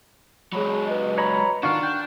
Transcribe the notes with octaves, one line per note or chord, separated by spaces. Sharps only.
F#3 G#3 G#4 C#5 B5
B4 D#5
C#5 A#5 B5
D#3 D4 F4 F#4 C#6 F6
G5